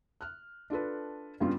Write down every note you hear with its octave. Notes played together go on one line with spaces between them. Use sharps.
F6 F#6
D4 F4 A4 B4
G2 C#3 G3 B3 F4